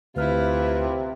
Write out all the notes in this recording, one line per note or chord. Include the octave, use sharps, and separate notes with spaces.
D2 C3 E4 F4 B4 F6